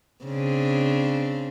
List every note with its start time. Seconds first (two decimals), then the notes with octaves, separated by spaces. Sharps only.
0.24 C#3 C4 D4